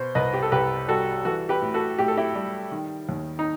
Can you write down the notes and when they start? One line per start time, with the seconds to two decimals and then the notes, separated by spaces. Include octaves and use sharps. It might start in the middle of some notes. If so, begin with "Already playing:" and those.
Already playing: B2 C5
0.15 C2 B4 D#5
0.33 G4
0.42 A4
0.52 C2 G4 B4
0.88 G3 F#4 A4
1.25 E3 F#4 A4
1.49 G4 B4
1.62 A2
1.74 F#4 A4
1.99 A2 G4
2.08 A4
2.17 E4 G4
2.35 G3
2.72 D#3
3.09 D#2
3.39 D#4